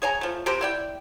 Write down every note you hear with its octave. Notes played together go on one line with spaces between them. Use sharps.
G#4 C#5 G#5 A#5
F3 A3
C3 G4 A#4 C5
E4 D5 G5